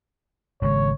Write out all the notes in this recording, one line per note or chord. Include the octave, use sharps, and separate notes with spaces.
G#1 C#3 G#3 C#5